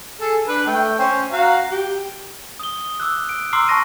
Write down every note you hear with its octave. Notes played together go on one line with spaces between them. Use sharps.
G#4 A4
D4 B4
A3 G5
C#4 C5
F#4 F5 A#5
G4
D#6 G7
D6 E6 F#6
D7
A#5 C6 D6 E6 F6 C7
A5 C#6 A#6 D#7